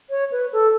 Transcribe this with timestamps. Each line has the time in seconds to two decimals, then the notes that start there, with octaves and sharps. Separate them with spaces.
0.10 C#5
0.32 B4
0.53 A4